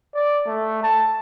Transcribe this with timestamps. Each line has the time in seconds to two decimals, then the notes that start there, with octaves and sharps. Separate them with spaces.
0.14 D5
0.46 A3
0.83 A5